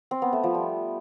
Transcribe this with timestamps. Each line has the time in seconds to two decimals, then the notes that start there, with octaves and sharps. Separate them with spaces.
0.11 C4
0.22 B3
0.33 A3
0.44 F3
0.54 G3